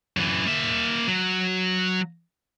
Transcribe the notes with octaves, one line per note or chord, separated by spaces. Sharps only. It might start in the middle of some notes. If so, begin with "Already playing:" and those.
F#2 E3
A#3 E5
F#3